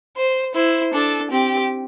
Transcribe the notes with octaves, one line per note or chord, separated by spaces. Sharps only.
C5
E4 C5
D4 A4
C4 G4